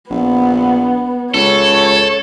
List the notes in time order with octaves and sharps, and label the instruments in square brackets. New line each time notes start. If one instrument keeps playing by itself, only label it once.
[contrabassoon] A#1 [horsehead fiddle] B3
[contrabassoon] C#2 [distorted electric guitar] A4 [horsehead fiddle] C#5